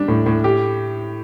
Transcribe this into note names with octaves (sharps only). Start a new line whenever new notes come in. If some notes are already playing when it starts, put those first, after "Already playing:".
Already playing: G3 D4
A2
A2
G4